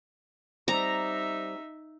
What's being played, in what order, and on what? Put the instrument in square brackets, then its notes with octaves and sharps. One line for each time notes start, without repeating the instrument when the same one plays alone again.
[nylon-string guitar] G3 C4 [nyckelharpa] D#4 E5 [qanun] A#5